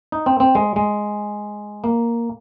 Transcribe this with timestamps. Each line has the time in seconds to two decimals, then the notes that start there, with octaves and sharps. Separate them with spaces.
0.12 D#4
0.26 C4
0.40 C4
0.55 G#3
0.76 G#3
1.84 A#3